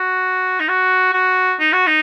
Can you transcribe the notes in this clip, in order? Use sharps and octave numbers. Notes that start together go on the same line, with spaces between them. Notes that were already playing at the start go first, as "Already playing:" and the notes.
Already playing: F#4
D#4
F#4
F#4
D#4
F#4
D#4